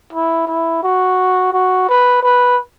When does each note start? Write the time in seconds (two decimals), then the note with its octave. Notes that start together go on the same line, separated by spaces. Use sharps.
0.13 E4
0.47 E4
0.83 F#4
1.53 F#4
1.89 B4
2.23 B4